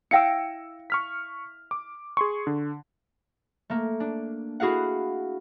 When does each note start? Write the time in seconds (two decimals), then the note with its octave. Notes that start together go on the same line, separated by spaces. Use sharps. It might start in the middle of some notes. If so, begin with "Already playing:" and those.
0.11 E4 F5 G5 E6 A#6 C#7
0.90 C#6 F6 B6
1.71 D6
2.17 G#4 C6 C#6
2.47 D3
3.70 A3 A#3
4.00 D4
4.60 E4 F#4 G#4 F5 F#5